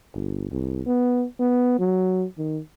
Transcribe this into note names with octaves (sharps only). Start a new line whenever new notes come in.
G1
C2
B3
B3
F#3
D#3